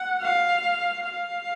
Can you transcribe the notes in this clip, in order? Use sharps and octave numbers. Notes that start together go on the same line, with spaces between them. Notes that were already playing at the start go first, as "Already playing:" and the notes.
Already playing: F#5
F5
F5